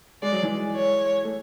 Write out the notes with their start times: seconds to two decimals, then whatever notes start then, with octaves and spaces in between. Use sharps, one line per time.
0.22 G#3 D5
0.32 F#3
0.42 E3 G#3
0.76 C#5
1.24 A3